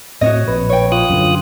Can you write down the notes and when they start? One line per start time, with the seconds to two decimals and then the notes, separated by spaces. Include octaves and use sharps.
0.21 A2 C4 F#4 C#5 D#5
0.48 A#1 B4
0.69 C#5 G5
0.92 F4 D#6 F#6
1.10 F#2 D3